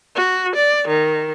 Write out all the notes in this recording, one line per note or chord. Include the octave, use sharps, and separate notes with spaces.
F#4
D5
D#3